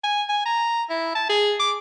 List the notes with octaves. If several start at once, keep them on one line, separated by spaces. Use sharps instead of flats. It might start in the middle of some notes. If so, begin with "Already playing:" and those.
G#5
G#5
A#5
E4
A5
G#4
D6